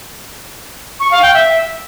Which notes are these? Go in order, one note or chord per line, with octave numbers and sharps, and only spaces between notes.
C#6
F5
G5
E5